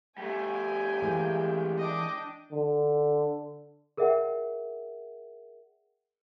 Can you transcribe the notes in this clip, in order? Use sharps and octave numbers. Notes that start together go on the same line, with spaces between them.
G3 A3 G5 G#5
E3 G#3 A#3
D4 D#5 G5 D6
D3
G#4 A#4 D5 E5 F#5 G5